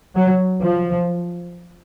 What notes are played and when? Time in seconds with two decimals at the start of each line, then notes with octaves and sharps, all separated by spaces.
0.16 F#3
0.63 F3